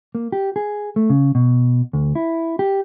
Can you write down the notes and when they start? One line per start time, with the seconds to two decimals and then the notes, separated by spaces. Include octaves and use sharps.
0.15 A#3
0.32 G4
0.56 G#4
0.96 A3
1.10 C#3
1.35 B2
1.93 D2
2.15 E4
2.59 G4